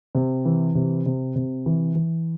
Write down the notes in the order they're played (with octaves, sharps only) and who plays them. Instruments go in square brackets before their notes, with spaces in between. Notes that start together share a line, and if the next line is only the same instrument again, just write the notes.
[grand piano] C3
E3
C3
C3
C3
E3
E3